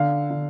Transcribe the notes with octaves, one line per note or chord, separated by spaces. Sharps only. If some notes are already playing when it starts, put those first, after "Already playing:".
Already playing: D3 F5
D3